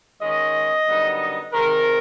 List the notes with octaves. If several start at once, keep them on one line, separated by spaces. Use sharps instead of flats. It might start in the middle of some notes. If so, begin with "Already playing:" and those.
D#3 G#3 C#4 D#5
F#2 D3 G3 B3 D#4
C3 D#3 G#3 C4 A#4